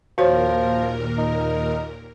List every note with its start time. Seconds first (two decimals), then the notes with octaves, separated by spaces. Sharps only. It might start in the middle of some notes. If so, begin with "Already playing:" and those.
0.18 D#2 A#2 F3 F#4 A#4 C5 C#5
1.18 D#4